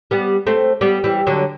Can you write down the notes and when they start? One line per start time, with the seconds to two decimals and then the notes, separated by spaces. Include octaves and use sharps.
0.11 G3 B3
0.47 A3 C4
0.81 G3 B3
1.04 E3 G3
1.27 D3 F#3